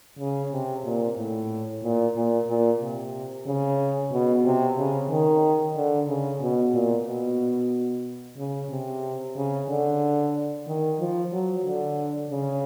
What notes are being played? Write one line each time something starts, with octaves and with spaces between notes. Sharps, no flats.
C#3
C3
A#2
A2
A#2
A#2
A#2
C3
C#3
B2
C3
C#3
D#3
D3
C#3
B2
A#2
B2
C#3
C3
C#3
D3
D#3
F3
F#3
D3
C#3